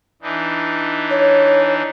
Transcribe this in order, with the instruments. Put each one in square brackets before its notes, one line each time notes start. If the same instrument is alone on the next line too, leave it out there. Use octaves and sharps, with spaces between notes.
[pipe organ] E3 D4 D#4
[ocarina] C#5